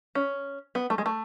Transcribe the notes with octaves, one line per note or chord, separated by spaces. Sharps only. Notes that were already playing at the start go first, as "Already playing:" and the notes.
C#4
B3
A3
G#3
A3